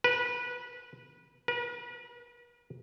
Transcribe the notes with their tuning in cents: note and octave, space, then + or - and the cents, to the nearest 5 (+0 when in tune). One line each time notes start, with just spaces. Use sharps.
B4 -20
B4 -40